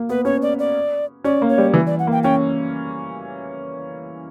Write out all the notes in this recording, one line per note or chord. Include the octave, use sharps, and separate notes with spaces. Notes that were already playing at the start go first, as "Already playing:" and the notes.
Already playing: A#3
B3 B4
C#4 C#5
D5
D5
C#4 D5
A#3
C#5
G3
E3
D5
F#5
A#3
G5
C#4 G5